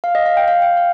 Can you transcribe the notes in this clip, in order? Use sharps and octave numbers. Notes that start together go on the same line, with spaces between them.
F5
D#5
F5
G5
F5
G5
F5